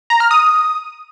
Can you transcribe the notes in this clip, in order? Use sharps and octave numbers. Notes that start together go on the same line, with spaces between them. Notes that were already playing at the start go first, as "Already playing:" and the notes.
A#5
F6
D#6